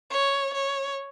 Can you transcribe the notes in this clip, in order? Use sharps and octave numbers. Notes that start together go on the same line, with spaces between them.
C#5
C#5